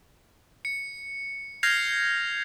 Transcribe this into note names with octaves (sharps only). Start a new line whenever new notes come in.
C#7
F6 G6 G#6 A#6 C7 F7